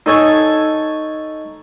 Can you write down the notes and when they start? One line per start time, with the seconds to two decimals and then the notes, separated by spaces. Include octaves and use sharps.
0.06 D#4 A4 C#5 G#5